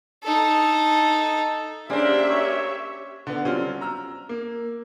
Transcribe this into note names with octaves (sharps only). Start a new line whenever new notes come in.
D#4 A4
A#3 C#4 D4 G4 G#4 C5 D5 E5
C#5
D3 B3
F#3 G3 C4 C#4 F4
A#5 E6 F6
A#3